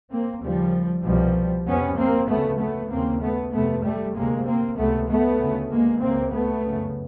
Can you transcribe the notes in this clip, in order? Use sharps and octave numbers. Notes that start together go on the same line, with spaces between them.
A#3 C4
D#2 C#3 F3 G3
C2 B2 F3 G3
F2 C3 B3 C#4
A#3 C4
D2 C#3 A3 B3
A3 B3
D#2 C#3 A#3 C4
A3 B3
F2 C3 A3 B3
G3 A3
D2 C3 G#3 A#3
A#3 C4
C#2 C3 A3 B3
A3 B3
D2 C#3
G#3 A#3
C#2 C3 A#3 C4
A3 B3
F#2 C#3